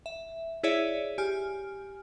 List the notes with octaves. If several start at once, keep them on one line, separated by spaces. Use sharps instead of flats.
E5
E4 G#4 C#5 D5 E5
G4 G#5 F6